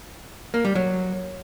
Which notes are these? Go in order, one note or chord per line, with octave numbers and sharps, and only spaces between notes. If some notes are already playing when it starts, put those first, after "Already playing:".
A#3
G3
F#3